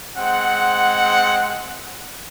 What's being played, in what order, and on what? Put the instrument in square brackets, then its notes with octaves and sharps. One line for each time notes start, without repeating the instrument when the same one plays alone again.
[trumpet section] G#3 C4 F#5